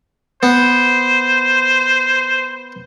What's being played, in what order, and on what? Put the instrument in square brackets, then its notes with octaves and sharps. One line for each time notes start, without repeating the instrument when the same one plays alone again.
[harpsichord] B3 [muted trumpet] C5